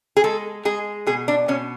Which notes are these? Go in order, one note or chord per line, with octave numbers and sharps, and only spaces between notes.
G#4
G#3 A4
G#3 G#4
B2 G#4
D4
B2 C#4